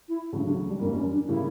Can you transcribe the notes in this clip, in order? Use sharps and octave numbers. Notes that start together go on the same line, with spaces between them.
E4
E1 D2 C#3 F#3
D4
G3
G1 F#2 E3 G3 A#3
C#4
D4
C#3 G3 A#3 E4